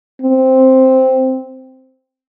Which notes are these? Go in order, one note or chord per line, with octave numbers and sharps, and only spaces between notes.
C4